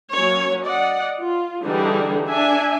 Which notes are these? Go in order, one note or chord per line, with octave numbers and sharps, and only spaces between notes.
F#3 A#3 C#4 C#5
D5 D#5 F#5
F4
D3 E3 G3 D4 D#4 G#4
D4 E5 G#5